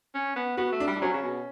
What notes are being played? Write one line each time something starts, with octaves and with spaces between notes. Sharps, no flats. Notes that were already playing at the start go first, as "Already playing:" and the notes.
C#4
B3
B3 F#4
A3
D4
G3
D4
F#3 C#4
C#3
B2